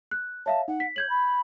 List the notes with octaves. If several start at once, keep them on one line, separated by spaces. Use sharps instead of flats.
F#6
C#5 E5 F5 A5
D#4 F#5
B6
C#5 G6 G#6 F#7
B5